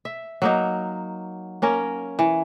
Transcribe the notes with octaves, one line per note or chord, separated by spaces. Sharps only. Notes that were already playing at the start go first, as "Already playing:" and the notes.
E5
F#3 A#3 D#4
A#3 C#4 A#4
E3